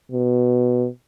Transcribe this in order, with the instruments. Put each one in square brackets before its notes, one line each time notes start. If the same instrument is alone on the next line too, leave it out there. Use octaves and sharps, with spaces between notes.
[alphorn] B2